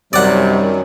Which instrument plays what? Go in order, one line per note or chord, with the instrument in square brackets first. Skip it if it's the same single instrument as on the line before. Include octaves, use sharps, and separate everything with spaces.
[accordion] F#2 D#3 F#3 [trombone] C3 [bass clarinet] G3 [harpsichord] D5 F#5